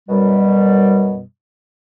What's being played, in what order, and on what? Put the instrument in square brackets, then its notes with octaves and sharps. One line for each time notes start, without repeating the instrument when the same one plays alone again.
[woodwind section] F#2 B2 G3